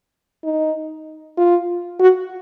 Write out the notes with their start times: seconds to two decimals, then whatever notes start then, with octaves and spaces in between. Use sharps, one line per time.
0.44 D#4
1.37 F4
2.00 F#4